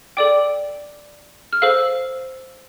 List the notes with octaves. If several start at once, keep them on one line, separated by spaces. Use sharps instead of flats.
A4 D5 G5 D6
F6
A4 C5 F5 E6